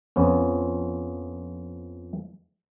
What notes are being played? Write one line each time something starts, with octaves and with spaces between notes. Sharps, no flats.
F2 F3 B3 C#4